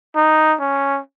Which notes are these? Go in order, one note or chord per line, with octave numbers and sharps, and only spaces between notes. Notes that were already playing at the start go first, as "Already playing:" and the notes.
D#4
C#4